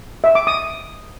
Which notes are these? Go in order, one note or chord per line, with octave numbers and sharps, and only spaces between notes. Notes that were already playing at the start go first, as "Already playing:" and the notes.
E5
D6
D#6